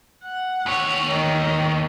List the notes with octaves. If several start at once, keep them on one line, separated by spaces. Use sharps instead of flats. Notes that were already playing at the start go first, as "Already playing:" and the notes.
F#5
D#2 C#5
D#3 D#5